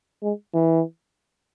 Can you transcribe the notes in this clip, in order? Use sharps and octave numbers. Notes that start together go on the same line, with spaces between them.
G#3
E3